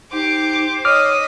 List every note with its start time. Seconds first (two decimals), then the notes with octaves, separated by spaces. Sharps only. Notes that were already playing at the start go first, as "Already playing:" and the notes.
0.13 D#4 G4 C5 D6
0.85 C#5 D#5 D6 D#6 F6 B6